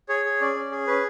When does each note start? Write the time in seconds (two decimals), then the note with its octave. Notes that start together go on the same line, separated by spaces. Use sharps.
0.09 G#4 C#5
0.25 G#4
0.41 C#4 D5
0.56 C#4
0.71 G#4
0.87 C#4 B4